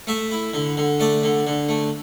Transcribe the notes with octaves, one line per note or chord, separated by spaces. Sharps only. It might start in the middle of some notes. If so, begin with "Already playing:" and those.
A3 E5
E4
D3
D3
A3 D5
D3
D3
A3